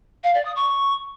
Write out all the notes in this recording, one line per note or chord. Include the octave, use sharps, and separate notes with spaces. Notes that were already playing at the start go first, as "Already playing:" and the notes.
F5
D5
D#6
C#6